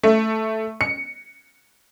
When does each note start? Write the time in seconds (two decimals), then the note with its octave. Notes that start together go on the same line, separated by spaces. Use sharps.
0.03 A3
0.81 C#7